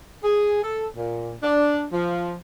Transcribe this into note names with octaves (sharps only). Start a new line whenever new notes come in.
G#4
A4
A#2
D4
F3